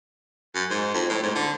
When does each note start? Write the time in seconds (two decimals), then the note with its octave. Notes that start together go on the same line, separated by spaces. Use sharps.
0.55 F#2
0.70 G#2
0.94 F2
1.09 A2
1.22 G#2
1.35 D3